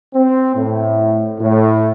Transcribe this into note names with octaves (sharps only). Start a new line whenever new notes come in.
C4
A2
A2